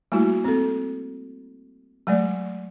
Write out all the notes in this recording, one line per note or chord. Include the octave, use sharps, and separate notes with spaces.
G3 A3 A#3 E4 F#4
C4 A4
F#3 G#3 A3 D5